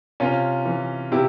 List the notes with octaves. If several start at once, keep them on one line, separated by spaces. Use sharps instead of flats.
C3 C#4 F4
E3
C3 E4 G4